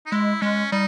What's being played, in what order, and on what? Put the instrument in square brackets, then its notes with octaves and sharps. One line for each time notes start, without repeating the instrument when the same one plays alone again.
[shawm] D#4
[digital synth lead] G#3 [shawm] E4
[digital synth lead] G#3 [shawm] C#4
[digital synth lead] G3 [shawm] D#4